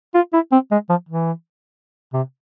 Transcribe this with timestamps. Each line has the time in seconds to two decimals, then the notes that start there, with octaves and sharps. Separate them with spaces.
0.15 F4
0.33 E4
0.52 C4
0.72 G#3
0.89 F3
1.09 E3
2.13 C3